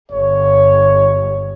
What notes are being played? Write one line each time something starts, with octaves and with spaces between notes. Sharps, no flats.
G1 C#5